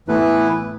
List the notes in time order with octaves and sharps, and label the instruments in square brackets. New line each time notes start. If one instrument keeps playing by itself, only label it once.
[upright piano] A2 A3 [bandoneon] E3 B3 E4 B4